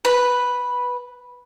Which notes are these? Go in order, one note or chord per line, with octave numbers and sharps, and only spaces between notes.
B4